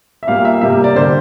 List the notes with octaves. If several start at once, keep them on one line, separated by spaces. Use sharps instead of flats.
E5
A#2 G3 A#3 F5
E5
C3 G3 A#3 E5
D5
D3 G3 C5